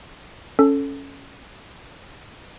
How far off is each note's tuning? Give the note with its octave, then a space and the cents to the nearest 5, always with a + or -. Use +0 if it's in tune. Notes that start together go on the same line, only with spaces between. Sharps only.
C#4 +0 A4 +0